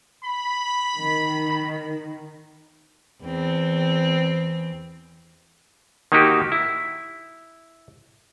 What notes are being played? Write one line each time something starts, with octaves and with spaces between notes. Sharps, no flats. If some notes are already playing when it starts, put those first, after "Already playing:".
B5
D#3
E2 C4
D#3 A#3 D#4 F#4 G4
E4